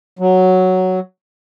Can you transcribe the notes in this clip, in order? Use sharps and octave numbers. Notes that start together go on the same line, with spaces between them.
F#3